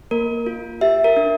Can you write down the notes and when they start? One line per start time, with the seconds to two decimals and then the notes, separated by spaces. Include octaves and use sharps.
0.11 A#3 A#4
0.46 F4
0.81 G4 E5
1.04 A#4
1.17 D4